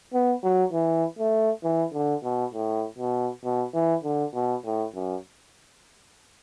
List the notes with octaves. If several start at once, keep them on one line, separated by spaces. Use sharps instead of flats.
B3
F#3
E3
A3
E3
D3
B2
A2
B2
B2
E3
D3
B2
A2
F#2